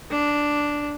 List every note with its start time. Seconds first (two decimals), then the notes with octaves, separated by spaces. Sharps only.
0.11 D4